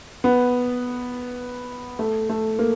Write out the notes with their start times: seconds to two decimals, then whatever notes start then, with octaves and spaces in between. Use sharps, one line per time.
0.24 B3
1.99 A3
2.29 A3
2.59 A#3